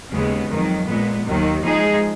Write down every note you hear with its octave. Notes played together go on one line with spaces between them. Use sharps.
D#2 C#3 G#3 B3
F2 D#3 F#3
A#2 G#3 B3
D#2 D#3 F#3
F3 G#3 D#4 G#4